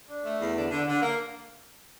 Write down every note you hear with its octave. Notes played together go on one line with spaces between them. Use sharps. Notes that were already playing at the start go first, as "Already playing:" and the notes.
D4
A3
E2
D3
D3
D3
A#3